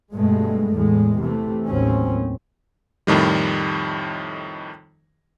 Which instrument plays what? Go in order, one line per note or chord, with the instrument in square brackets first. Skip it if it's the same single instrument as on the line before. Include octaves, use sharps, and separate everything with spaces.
[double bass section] G2 B2 G#3 A3
E2 A2 G#3
C3 E3 A3
A1 D#2 F#3 C4 C#4
[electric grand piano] F2 A2 D#3 G3